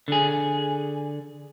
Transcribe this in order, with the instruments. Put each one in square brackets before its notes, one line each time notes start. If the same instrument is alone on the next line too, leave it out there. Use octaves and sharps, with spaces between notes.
[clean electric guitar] D3 G#4